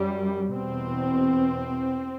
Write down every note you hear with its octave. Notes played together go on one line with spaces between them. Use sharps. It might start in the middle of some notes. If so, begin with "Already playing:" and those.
Already playing: F#2 G3
E2 B2 C4